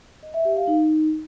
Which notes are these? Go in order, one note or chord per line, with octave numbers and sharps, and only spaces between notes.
D#5
E5
G4
F5
D#4